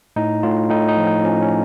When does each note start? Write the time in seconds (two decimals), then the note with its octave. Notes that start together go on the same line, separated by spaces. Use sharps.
0.16 A2 D#4
0.43 A2 F4
0.70 A2 D#4
0.88 D#4
0.97 F3
1.07 D#4
1.24 F3 C#4
1.42 C#4